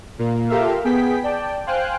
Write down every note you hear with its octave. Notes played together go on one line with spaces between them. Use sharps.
A#2 A#3
F4 G4 A4 A#4 E5 F5
B3 G#4 G5 B6
D5 G5 A5
C5 F5 G5 G#5 F#6